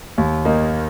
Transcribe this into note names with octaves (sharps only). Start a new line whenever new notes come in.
D#2
D#3 A#3 D#4